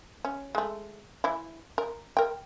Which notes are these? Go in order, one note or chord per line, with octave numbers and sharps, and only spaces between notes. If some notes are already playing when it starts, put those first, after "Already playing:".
C#4
G#3 A3
E3 E4
A#4
A#4 G5